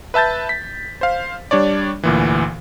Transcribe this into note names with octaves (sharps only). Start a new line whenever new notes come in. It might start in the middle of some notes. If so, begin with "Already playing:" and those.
B4 E5 A5 G6 A6
B6
C5 F5
G3 D4 C#5 D5
D2 A#2 E3